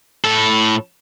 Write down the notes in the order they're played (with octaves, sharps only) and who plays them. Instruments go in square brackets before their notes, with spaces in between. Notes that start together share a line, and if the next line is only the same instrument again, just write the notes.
[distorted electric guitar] A2 A4